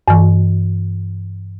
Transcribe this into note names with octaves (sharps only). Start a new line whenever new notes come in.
G2 E3